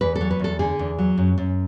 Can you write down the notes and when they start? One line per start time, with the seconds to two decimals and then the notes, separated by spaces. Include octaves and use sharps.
0.01 E2 B4
0.16 A4
0.21 F#3
0.31 B4
0.39 E2 A4
0.59 D3 G#4
0.79 E2
0.98 F#3
1.18 F#2
1.38 F#2